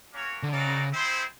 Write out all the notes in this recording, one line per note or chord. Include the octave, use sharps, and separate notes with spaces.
A#3 C#4 F#4 A#4 C#5
D3
C#3 C4 D#4 F#4 A#4 D5
C4 E4 G#4 C5